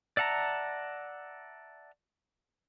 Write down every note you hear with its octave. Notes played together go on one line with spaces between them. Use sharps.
D5 E5 F#5 A5 A#5